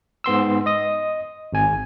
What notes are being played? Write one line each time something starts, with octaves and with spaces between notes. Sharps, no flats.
G#2 B3 C6 E6
D#5 D#6
G#1 G#5